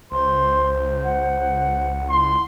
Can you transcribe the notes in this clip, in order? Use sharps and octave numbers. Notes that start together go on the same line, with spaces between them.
C#2 C5 C6
F#5
E4 C6